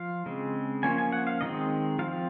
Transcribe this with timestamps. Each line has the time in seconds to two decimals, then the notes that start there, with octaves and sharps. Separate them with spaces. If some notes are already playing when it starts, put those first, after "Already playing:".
Already playing: F3 F5
0.26 C#3 G#3 C4
0.83 F3 A#3 C#4 G#5
0.98 G#5
1.12 F#5
1.27 F5
1.41 D#3 G#3 C4 D#5
1.99 F3 C4 F5